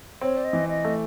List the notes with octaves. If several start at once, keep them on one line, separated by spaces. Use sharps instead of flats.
C4 C#5
D5
D#5
E3
D#5
A3